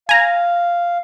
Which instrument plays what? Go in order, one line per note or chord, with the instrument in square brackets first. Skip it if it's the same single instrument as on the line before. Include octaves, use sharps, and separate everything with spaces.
[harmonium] F5 [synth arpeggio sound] G#5 A#5